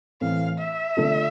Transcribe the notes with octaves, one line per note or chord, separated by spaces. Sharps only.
A2 E3 A3 C4 F5
E5
D3 A3 D4 F4 A4